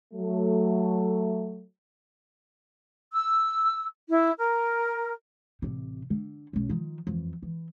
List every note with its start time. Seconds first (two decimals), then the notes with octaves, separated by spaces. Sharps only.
0.14 F#3 A3
3.12 E6
4.09 E4
4.38 A#4
5.62 A1 C3
6.10 D3
6.53 B1 C#4
6.69 D#3 F3
7.07 F2 E3
7.43 E3